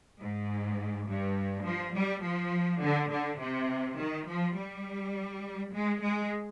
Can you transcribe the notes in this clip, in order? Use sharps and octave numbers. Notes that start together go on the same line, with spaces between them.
G#2
G2
F3
G3
F3
D3
D3
C3
D#3
F3
G3
G#3
G#3